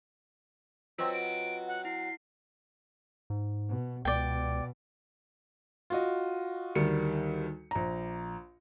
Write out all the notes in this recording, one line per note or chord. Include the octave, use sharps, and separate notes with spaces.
F#3 C4 F4 B4 D#5 E6
D7
F#5
E4 C7
G#2
B2
C#2 B2 D5 G5
F4 F#4 D#5
D2 D#3 G3 C#7
A#1 A#5